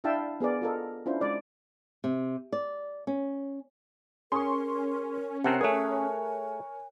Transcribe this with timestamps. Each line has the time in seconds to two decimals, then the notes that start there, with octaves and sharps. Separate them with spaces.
0.04 D4 E4 E5 F5 G5 A5
0.40 B3 G#4 A#4 D5
0.62 F4 A4 A#4 D#5
1.06 C#4 D4 E4 F4 C5
1.21 G#3 D5 D#5
2.04 C3
2.52 D5
3.07 C#4
4.32 C#4 G#4 A#4 C6 C#6
5.44 C3 C4 A#4 F#5 A5 F#6 C7
5.61 A3 G#4 A#4 C#5 G#5